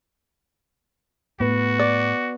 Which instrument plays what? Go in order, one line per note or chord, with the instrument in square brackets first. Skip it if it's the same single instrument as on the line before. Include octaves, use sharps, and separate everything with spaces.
[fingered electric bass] A2 [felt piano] B3 [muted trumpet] F#4
[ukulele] D5